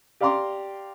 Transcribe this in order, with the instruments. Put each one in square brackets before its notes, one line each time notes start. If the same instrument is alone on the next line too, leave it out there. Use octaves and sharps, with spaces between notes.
[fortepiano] G4 D5 F5 A#5 C6 D6